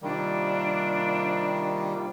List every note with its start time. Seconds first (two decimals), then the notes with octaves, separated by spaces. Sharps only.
0.02 C3 D#3 F3 G3 A#3 D4